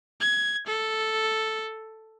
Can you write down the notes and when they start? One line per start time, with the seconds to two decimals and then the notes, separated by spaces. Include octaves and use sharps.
0.21 G#6
0.67 A4